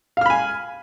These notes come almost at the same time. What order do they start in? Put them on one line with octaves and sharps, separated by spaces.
F5 F6 B5 G#5